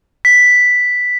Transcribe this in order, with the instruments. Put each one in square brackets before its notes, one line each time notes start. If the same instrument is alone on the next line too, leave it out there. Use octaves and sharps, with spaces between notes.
[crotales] B6